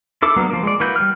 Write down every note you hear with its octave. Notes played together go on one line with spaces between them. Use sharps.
E4 A4 D6
F#3 A#3 B3 D4
F3 A#3
G#3 D5
E3 A#3 F#4 B4 G6
G3 F6